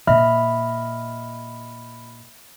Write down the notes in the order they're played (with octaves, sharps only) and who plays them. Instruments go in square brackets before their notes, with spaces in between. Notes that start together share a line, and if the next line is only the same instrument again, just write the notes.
[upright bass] A#2 [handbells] D#5 B5 F6 [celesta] E5